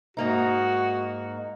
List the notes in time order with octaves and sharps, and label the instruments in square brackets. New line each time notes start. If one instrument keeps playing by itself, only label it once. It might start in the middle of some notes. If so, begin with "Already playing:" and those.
[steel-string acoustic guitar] G#2 A#3 D#4 [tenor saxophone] F#4